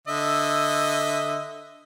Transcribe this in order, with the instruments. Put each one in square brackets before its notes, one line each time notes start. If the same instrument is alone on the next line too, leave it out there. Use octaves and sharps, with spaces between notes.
[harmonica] D3 D#5 E5